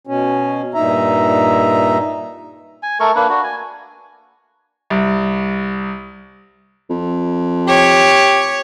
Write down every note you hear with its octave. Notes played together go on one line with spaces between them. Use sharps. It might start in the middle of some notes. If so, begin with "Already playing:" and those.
B2 C#4
G2 A#2 D#4 E5 A#5
G#5
A3 A4 A#4 C#6
A#3 D4 B4
D4 F#4
G#5
C2
F2
G4 C#5